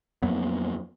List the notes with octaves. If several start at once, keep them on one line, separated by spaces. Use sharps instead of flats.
F2 F#3 A#3 B3